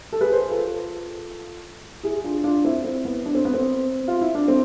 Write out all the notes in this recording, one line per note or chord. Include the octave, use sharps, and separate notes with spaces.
A4
G#4 B4
C5
B4
F4 A4
E4 G#4
D4 F4
D4 F4
C4 E4
C4
B3
D4
C4
B3
C4
F4
E4
D4
C4